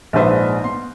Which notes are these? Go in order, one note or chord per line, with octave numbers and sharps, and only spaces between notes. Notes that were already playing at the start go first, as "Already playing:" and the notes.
A#1 G#2 D4 B4 C5 E5
B3 C6